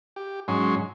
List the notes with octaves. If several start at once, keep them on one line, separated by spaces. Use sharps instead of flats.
G4
G#2 F#3 C#4 C6